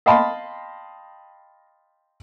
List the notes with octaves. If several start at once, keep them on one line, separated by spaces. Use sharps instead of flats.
D#5 F5 G5 A5 B5 C6